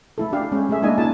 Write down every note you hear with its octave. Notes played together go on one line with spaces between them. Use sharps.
A3 E4 A4
D4 G4 F5
G#3 C#4
A3 G#4 E5
G#3 A#3 D4 E4 D#5 G#5
C#4 D#4 F4 A5